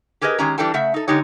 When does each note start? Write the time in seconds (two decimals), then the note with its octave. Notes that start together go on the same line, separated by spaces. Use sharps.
0.21 G4 G#4 A#4 B4 C#5 D#5
0.38 D#3 G#3 C#4 G4 A#5
0.58 E3 G3 D4 A4 G5 A5
0.74 C#3 A3 E5 F#5
0.94 D#4 A4
1.08 D3 G#3 D#4 G4 C#5